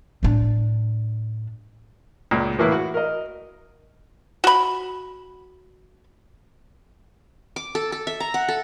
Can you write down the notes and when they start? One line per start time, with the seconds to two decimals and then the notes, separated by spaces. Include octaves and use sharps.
0.23 A2 D4
2.31 C#2 A#2
2.58 A2 E3 A#3 E4 B4
2.72 F#4
2.94 A#4 D#5
4.44 F#4 B5
7.56 D6
7.75 A4
7.92 A4
8.07 E5
8.20 A#5
8.34 F#5
8.49 A4